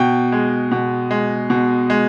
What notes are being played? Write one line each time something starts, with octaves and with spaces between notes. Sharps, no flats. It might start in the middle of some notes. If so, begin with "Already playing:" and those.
Already playing: B2 G5
G#3
B2
G#3
B2
G#3